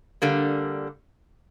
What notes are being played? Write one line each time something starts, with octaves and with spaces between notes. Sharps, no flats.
D3 G3 A#3